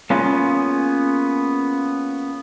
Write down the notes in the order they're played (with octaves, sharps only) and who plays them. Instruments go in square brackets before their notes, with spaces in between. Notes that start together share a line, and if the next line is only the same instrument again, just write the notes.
[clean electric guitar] A#3 B3 C#4 F4 G#4